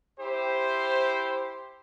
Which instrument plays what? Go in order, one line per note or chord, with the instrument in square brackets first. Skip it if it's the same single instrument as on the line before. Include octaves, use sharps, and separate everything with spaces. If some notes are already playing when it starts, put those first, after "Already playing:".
[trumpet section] E4 G4 C5